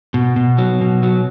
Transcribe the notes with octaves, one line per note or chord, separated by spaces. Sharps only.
B2
B2
F#3
B2
F#3